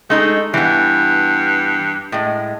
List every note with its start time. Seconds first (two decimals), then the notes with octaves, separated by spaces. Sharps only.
0.10 G#3 A3 D#4 G#4
0.54 G2 E3 B3
2.12 A2 G#3